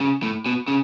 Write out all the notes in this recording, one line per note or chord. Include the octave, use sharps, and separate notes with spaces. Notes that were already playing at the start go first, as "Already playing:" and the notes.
C#3
A2
B2
C#3